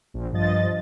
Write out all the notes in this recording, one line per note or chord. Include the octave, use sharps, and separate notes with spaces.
A#1
G2 F3 D#5 A6